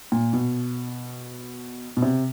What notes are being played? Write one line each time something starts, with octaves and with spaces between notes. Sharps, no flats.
A#2
B2
B2
C3